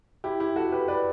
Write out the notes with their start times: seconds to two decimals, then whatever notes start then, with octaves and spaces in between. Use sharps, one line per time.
0.24 E4 G4
0.40 E4 G4
0.56 F#4 A4
0.72 G4 B4
0.88 B4 D5